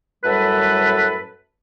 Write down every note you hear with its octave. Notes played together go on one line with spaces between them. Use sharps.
F#2 A2 G3 A4 B4